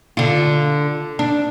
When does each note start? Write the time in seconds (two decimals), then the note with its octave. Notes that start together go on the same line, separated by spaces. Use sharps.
0.17 D3 F4
1.19 D4